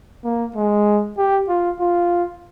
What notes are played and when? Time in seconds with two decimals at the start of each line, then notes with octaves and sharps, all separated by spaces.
0.24 A#3
0.56 G#3
1.17 G4
1.48 F4
1.80 F4